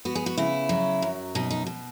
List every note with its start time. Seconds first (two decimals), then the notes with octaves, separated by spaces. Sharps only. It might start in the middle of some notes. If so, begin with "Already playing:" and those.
0.05 B3 F#4
0.15 G#4
0.26 F#4
0.38 C#3 E4
0.69 F#3
1.02 F#2
1.35 B2 D#4
1.51 D#4
1.66 B2